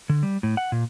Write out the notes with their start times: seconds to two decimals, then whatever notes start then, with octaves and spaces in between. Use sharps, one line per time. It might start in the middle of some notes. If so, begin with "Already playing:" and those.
0.09 D3
0.23 G3
0.43 A2
0.57 F#5
0.72 A#2